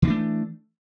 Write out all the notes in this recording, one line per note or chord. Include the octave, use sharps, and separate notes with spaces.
E3 A3 C#4 D4